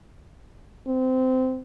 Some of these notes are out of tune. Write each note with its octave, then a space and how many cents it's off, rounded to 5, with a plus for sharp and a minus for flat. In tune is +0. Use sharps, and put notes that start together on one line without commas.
C4 -20